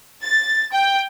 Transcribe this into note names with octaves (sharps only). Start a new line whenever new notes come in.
A6
G5